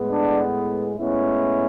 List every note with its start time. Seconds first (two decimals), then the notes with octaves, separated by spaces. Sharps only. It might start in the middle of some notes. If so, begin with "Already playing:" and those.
Already playing: A2 G#3 B3
0.11 D4
0.97 A2 G#3 B3 C#4 E4